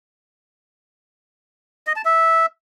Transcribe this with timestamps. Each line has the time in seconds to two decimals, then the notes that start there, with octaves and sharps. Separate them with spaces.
1.87 D#5
1.96 A5
2.05 E5